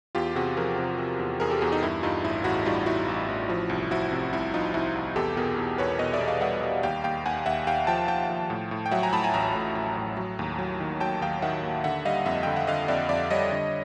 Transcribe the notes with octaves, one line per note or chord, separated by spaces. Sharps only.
E2 F4 G4
C3 F#4 G#4
F3 G#4 A#4
C3
C3
E2
E2 G#4 A#4
G4 A4
E2 F#4 G#4
D#4
G2 E4
G2 D#4 F4
A1 E4
A1 E4 F#4
G3 D#4 F4
A1 E4 F#4
A1
A1
F3
C2
F3 E4 F#4
C3
C2 E4
F3 D#4 F4
C2 E4 F#4
C2
E2 G4 A4
B2 G#4 A#4
E2
E2 B4 C#5
B2 C#5 D#5
D5 E5
E2
D#5 F5
G3 E5 F#5
G3
D#2 F5 G5
D#2 F5 G5
D#2 F#5 G#5
D#2 E5 F#5
D#2 F5 G5
F3 G5 A5
F3 G5 A5
F3
A2
A2
G5
F#3 E5 F#5
G#5 A#5
A2 A5 B5
G#5 A#5
A1 G#5 A#5
A2
A2
A2
F#3
D#2
F#3
D#3
F#3 G5 A5
D#2 F5 G5
D#3 E5 F#5
D#2
D3 E5 F#5
G3 D#5 F5
F2 E5 F#5
D3 G5
F#5
D3 D#5 F5
F2 D5 E5
F2 D5 E5
G3 C#5 D#5
D3